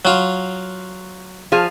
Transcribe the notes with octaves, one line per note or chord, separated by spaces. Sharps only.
F#3 F4
F3 G#4 F5